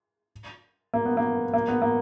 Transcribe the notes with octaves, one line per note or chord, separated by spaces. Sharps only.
A#3
B3
A#3
A#3
B3
A#3